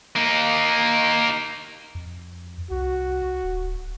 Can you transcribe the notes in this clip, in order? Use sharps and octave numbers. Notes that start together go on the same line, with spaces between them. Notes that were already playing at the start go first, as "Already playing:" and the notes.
A#3 D#4
F2
C2 F#4
D1